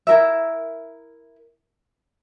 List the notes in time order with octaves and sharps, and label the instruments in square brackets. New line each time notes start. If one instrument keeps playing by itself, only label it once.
[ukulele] E4 A#4 E5